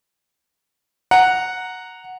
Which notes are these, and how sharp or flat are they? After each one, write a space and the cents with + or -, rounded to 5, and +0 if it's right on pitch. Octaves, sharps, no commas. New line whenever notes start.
F#5 -5 A#5 -5